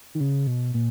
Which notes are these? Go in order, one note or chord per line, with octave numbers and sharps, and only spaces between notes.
D#3
C#3
B2
A#2